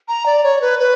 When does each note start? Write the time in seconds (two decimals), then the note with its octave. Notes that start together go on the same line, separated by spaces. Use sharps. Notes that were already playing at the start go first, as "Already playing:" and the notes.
0.08 A#5
0.26 D5
0.43 C#5
0.61 B4
0.79 B4